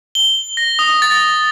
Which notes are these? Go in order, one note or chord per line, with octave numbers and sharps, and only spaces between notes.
G7
A#6
D#6
A6